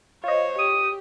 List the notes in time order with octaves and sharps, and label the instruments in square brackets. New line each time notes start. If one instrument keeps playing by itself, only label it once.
[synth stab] F4 D#5 [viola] C5 C#5
[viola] G4 [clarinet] D#6